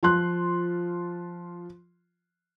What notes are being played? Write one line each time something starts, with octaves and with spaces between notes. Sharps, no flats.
F3 F4 C6 F#6